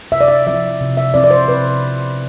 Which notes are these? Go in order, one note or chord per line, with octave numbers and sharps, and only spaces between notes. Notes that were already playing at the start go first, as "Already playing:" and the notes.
C3 E5
D5
E5
F3 C4 E4 E5
C3
E5
F3 C4 E4 D5
D5
C5
C3 B4